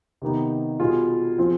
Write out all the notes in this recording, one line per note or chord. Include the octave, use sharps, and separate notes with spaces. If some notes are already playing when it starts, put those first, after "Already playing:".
C3 D#3 B3 D#4 G4
B2 G3 B3 F4 G#4
F3 C4 F4 G#4